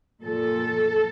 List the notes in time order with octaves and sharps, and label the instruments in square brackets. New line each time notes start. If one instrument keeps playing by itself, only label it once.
[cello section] A#2 A4